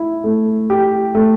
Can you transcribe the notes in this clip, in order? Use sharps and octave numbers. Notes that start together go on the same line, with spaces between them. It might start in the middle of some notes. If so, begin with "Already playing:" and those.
Already playing: E4
A3
G4
A3